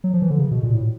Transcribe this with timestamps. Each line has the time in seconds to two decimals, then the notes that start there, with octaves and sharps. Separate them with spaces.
0.04 F#3
0.13 F3
0.22 E3
0.31 D3
0.39 C#3
0.51 B2
0.63 A#2
0.74 A2